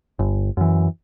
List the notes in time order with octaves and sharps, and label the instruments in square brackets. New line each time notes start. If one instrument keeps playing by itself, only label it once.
[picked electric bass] G1
F#2 E3